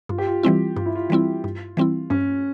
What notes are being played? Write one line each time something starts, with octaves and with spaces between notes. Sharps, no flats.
G2 F4
G4
F4
E3 G3 C4 E4
G2 F4
E4
F4
E3 G3 C4 E4
G2
E3 G3 C4 E4
G2 C#4